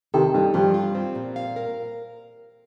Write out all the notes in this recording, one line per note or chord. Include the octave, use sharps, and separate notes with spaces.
C3 D#3 A4
G2 D#4
G2 F3
F4
C4
A#2
F5
A#4